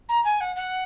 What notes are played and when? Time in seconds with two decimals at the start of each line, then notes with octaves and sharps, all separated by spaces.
0.09 A#5
0.24 G#5
0.41 F#5
0.56 F#5